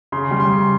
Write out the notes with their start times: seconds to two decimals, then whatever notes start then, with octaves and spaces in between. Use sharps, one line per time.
0.12 C#3 C6
0.31 G3
0.40 C6
0.50 C#3